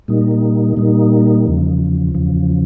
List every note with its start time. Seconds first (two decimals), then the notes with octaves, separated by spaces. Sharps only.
0.08 A#2 G3 A#3 D#4
0.77 A#2 G3 A#3 D#4
1.46 E2 C#3 F3
2.15 E2 C#3 F3